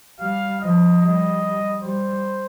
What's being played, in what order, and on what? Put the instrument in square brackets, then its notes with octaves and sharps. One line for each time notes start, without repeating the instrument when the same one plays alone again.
[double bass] G3 [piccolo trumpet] F5
[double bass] F3 [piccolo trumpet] D#5
[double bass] G3 [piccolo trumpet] D#5
[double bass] G3 [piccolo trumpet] C5